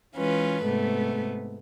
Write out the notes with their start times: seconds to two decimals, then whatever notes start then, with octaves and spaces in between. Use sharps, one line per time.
0.15 E3 G#3 C#4 F4 B4
0.65 G#2 C3 A3 B3